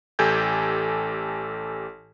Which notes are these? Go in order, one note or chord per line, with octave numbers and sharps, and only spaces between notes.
A1 G4 A4 G#5 G6 G#6